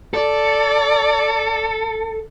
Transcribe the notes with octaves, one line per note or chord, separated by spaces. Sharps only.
A4 D5